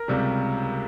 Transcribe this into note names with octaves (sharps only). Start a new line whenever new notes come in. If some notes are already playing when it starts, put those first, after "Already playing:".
Already playing: A#4
C#2 C3 G3